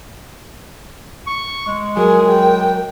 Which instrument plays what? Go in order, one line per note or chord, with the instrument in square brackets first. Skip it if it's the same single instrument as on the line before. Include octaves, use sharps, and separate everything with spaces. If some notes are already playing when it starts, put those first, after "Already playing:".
[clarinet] C#6
G#3
[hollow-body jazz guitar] F#3 [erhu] G#4 [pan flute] A#4
[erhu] G5